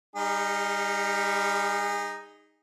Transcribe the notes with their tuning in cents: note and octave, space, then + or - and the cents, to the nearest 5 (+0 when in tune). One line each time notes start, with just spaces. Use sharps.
G3 +25 D#4 +0 G#4 -30